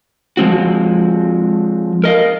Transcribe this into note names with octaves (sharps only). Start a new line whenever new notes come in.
F3 G#3 C4 F#4
A#4 D#5 F5